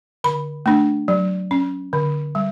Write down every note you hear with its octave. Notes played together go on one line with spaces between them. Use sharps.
D3 B5
A3 D4
F#3
C#4
D3
G3